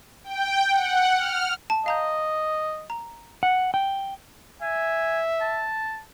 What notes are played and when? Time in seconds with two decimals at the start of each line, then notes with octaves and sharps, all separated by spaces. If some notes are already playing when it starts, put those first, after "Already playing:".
0.24 G5
0.70 F#5
1.17 F6
1.70 A5
1.86 D#5 F5 A#5 G6
2.90 A#5
3.43 F#5
3.74 G5
4.62 E5 G#5
5.41 A5